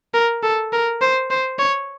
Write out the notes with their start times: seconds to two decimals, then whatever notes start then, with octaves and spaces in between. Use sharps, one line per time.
0.14 A#4
0.43 A4
0.73 A#4
1.01 C5
1.31 C5
1.59 C#5